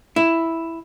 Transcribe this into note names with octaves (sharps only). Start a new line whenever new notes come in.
E4